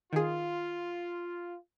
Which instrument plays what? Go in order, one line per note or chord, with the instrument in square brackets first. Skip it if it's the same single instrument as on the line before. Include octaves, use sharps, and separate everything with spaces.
[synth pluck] D#3 G#4 [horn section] F4